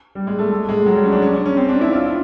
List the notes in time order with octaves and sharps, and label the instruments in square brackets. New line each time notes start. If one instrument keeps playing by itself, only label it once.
[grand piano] G3
G#3
A3
A3
G#3
F#3
G3
C#4
D4
C#4
C#4
C#4
C4
D4
E4
F4